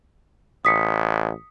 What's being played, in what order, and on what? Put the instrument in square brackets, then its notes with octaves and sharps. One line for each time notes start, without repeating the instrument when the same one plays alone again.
[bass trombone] A1 [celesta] D#6 B6 C#7